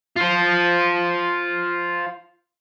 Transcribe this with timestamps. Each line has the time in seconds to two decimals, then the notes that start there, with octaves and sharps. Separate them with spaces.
0.17 F4 C5